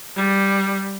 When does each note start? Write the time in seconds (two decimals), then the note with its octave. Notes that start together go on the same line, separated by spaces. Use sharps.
0.16 G3